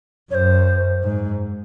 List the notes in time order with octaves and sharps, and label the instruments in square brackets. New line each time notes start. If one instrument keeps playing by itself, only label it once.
[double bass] F#2 [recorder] C#5
[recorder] C5
[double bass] G#2